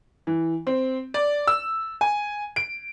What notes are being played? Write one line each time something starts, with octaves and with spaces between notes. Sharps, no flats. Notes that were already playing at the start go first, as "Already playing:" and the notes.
E3
C4
D5
E6
G#5
D7